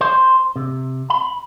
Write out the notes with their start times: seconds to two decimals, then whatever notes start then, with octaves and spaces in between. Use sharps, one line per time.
0.01 C5
0.56 C3
1.10 B5